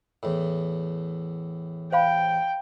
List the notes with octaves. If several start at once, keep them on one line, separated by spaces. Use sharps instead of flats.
E2 A2
C5 F5 G5 B5